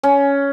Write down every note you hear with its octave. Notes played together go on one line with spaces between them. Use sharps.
C#4